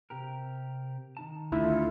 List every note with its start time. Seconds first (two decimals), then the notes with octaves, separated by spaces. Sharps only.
0.10 C3 G4 A#4
1.17 D#3 D#4 A5
1.52 D2 E4 F4 A4